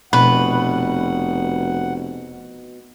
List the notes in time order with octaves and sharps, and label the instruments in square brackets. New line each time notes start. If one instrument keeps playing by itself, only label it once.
[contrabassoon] F1 [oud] B2 [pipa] B4 [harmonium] F#5